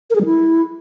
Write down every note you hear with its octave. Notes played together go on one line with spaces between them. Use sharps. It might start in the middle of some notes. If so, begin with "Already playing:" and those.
A#4
G#4
G3
E4